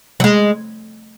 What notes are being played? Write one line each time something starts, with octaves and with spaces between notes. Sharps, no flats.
F#3
G#3